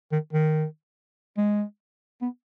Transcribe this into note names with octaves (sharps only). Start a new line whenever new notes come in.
D#3
D#3
G#3
B3